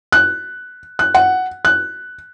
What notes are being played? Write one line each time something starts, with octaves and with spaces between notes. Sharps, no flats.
F#6
F#6
F#5
F#6